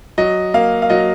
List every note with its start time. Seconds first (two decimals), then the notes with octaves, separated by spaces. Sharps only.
0.18 F#3 D#5
0.54 A#3 F5
0.82 F5
0.90 F#3 D#5